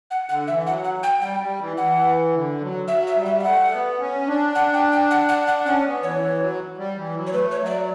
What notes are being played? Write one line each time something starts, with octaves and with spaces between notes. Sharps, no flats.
F#5
D3 F#5
E3 E5
F#3 F#5
F#5
G5
G3 G5
G3
E3
E3 F#5
D3
F#3
F#3 E5
E5
G3
E5
E5
A3 F#5
B3
C#4
D4
F#5
G5
G5
F#5
F#5
F#5
C#4 F#5
B3
E3 C#5
E3
F#3
G3
E3
F#3
C#5
A3 B4
C#5
F#3
E5
D5